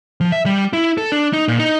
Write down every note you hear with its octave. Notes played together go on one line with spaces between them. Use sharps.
F3
E5
G3
E4
A4
D4
D#4
A#2
D#4